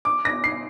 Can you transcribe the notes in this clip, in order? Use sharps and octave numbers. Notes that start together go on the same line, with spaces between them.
D6
A#6
C7